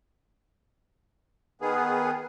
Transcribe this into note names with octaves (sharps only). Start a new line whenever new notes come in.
D#3 B3 G#4